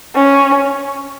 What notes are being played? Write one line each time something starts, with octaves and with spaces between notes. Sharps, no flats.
C#4